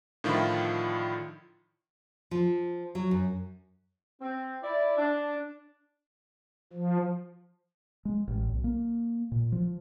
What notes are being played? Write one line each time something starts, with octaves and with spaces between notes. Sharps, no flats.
A2 D3 D#3 F3 E4 F4
F3
F#3
F#2
C4
E4 D5
D4
F3
G#3
A1
B1
A#3
A#2
F3